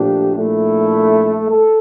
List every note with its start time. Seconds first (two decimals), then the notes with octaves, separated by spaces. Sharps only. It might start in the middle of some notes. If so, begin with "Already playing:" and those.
Already playing: A#2 F3 A3 D4 G4
0.33 A#1 A#2 A3 E4
1.49 A4